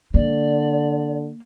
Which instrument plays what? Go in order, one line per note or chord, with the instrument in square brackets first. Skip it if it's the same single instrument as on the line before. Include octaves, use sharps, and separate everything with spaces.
[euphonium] D3 [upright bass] A#3 [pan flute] D5